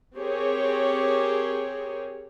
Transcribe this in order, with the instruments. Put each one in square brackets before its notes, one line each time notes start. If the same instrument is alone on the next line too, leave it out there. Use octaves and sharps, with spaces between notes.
[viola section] C4 G4 G#4 A#4 C#5